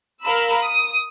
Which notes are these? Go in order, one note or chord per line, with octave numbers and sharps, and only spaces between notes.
A#4 F5 B5 E6
D#6